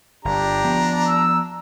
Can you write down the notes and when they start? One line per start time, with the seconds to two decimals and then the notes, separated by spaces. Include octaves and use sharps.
0.25 G1 D4 G4 A#5
0.64 F3 B3
1.08 E6